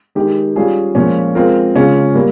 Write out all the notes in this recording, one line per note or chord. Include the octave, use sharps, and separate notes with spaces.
D#3 G#3 D#4 G4 A#4
G3 C#4 F4 G#4
A#2 F3 G#3 C#4
G#3 C4 F4 A#4
C#3 G#3 C#4 F4
G3 A#3